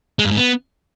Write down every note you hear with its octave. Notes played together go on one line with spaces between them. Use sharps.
G#3
G2
G#2
B3